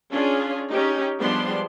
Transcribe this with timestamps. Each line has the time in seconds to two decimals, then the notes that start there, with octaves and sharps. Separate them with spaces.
0.13 C#4 D4 F4 G#4
0.71 C#4 D#4 G4
1.20 F3 G3 G#3 B3 D4 C6